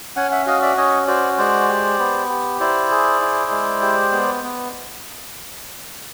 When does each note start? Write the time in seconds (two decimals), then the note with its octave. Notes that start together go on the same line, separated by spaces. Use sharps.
0.16 C#4 F#5 G#5
0.31 E5 F#5
0.46 F#4 D#5 F5
0.62 D5 E5
0.77 C#4 C#5 D#5
1.07 F#4 C5 D5
1.38 G#3 C5 D5
1.69 G4
1.99 B3
2.30 G4
2.60 E4 C5 D5
2.91 G#4
3.21 E4
3.51 G#3
3.82 G4
4.12 B3
4.43 B3